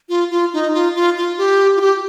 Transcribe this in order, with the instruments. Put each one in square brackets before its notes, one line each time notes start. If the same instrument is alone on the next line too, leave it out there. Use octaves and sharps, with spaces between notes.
[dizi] F4
F4
D#4
F4
F4
F4
G4
F4
G4